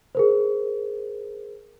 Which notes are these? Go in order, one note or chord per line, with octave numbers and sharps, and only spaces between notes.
G#4 A#4 C5